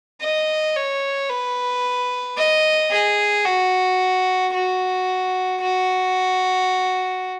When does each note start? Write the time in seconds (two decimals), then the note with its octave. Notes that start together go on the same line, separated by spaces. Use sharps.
0.21 D#5
0.76 C#5
1.30 B4
2.37 D#5
2.91 G#4
3.45 F#4
4.54 F#4
5.61 F#4